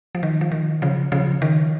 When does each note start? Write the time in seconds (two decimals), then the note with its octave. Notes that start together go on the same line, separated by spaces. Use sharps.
0.15 F3
0.23 D#3
0.41 F3
0.52 D#3
0.82 C#3 F3
1.12 C#3 F3
1.42 D#3